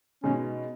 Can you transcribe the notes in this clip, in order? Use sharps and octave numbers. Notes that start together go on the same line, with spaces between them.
B2 G#3 C#4 D#4